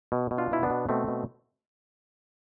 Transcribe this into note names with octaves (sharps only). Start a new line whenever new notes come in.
B2
B2
D4 F4
B2 E4
B3 D4
B2
B2 A3 C4
B2